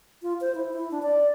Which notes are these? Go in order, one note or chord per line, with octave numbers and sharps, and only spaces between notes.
F4
C5
E4
E4
D4
D5